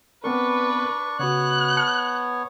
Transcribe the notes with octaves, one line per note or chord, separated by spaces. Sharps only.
B3 C4 D4 A#4 B4 C#6
C#3 B3 F#4 C#5 F#6
A5 C#7